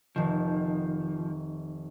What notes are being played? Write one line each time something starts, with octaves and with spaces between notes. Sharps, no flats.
F1 D#3 F3